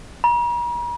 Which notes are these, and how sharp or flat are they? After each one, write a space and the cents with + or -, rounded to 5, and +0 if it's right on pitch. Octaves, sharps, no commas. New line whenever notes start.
A#5 +45